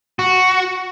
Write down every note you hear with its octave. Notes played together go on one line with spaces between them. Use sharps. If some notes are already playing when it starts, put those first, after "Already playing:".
F#4